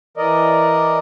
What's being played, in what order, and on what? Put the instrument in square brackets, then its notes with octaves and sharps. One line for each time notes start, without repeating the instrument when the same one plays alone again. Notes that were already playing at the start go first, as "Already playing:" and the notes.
[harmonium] E3 A#4 D5 D#5